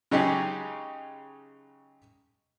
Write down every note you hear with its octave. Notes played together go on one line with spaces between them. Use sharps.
C#3 F#3 G#3 D#4 G4 G#4